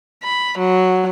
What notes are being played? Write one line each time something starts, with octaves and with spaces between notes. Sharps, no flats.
B5
F#3